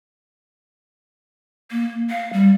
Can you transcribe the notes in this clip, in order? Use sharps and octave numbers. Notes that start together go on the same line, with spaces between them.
A#3
F5
G3